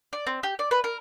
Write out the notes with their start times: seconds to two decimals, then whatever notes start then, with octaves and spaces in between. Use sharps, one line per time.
0.13 D5
0.27 C4
0.43 G4
0.59 D5
0.71 B4
0.84 A#4